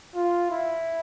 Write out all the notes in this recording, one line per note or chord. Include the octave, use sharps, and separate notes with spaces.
F4
E4